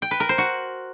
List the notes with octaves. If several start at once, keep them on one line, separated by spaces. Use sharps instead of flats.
G5
B4
A#4
C5
F#4